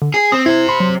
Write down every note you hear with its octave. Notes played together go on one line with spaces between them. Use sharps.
D3
G#4 C7
C4 D#6
E4 G4 C5 G#6
B5 C6
F#3